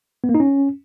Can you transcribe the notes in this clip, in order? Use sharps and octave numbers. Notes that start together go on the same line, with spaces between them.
B3
A#3
D#4
C#4